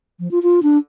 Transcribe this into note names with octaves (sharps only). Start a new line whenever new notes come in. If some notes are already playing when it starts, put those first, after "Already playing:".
F3
F4
F4
D4